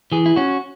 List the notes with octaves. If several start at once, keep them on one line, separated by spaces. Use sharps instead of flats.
E3 G#4
E4
C#4 F#4